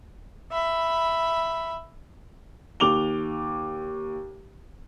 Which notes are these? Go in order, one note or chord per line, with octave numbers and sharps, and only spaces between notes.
E5 B5
D#2 D6 F7 G7